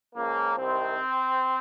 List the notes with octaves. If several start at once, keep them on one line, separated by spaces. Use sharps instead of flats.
C#2 C#3 F3 A#3
C2 C3 D#3 C4